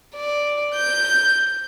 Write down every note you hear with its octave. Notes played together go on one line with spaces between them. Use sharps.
D5
G6